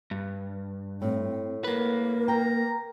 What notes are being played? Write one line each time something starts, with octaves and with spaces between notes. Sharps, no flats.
G2
A2 C4
A#3 A#4 B4
G5 A#5